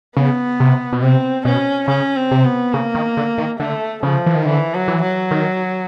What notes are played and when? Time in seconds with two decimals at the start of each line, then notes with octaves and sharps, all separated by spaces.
0.17 C#3 B3
0.60 C3
0.93 B2
1.02 C3 C4
1.45 B2 C#4
1.88 C#3 C#4
2.16 C4
2.31 C3
2.45 B3
2.73 C#3 A#3
2.95 D#3
3.17 D3
3.38 D#3
3.59 D3 A3
4.03 C#3 F3
4.26 E3
4.35 D#3
4.45 D3 E3
4.74 F#3
4.88 E3
5.02 F#3
5.31 D#3